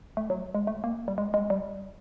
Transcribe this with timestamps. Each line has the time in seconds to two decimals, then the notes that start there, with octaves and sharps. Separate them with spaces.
0.17 A3
0.30 F#3
0.55 G#3
0.67 A3
0.84 A#3
1.08 G3
1.18 G#3
1.34 G#3
1.50 G3